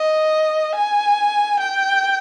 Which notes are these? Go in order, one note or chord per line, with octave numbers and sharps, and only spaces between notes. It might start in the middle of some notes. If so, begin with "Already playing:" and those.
Already playing: D#5
G#5
G5